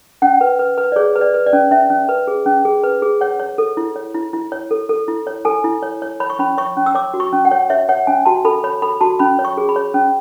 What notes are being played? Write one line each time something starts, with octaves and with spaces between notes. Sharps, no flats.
C#4 F#5
B4
B4
B4
D5
G#4 C#5
B4
D5
B4
D5
C#4
C#4 E5
C#4
B4
G#4
C#4
G#4
B4
G#4
C#5 F#5
C#5
A4
E4
C#5
E4
E4
C#5
A4
A4
E4
C#5
A4 G#5
E4
C#5
C#5
C#5 B5
C#6
C#4 B5
C#5 C#6
C#4
E6
C#5 D6
F#4
C#6
C#4
F#5
C#5
C#5 E5
C#5 F#5
C#4 G#5
F#4 A5
A4 B5
C#5 B5
A4 B5
F#4 A5
C#4 B5
C#5
C#6
G#4
B5
C#5
C#4